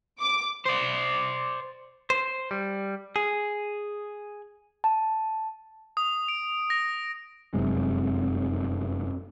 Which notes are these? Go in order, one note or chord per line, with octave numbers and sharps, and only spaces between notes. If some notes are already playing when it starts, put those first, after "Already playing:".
D6
C5 D5
C5
G3
G#4
A5
D#6
D7
A#6
F1 F#2 C3 G#3